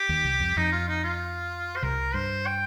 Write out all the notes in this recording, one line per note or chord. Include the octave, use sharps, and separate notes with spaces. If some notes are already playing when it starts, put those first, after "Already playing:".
Already playing: G4
D#2 D#3
C2 C3
F2 F3
F2 F3 D#4
F4
D#4
F4
C5
C2 C3 A#4
G2 C5
G5